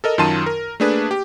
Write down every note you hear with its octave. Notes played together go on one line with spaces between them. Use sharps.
A4 A#4 D#5
F#2 D#3 F4 A5 C6 D#7
A#4
A3 A#3 D4 G#4 B4
G4